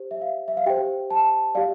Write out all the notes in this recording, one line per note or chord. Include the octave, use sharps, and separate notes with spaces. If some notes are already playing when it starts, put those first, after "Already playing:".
Already playing: G4 C5
E5
F5
E5
F5
G4 C5 G5
A5
G4 D5 F5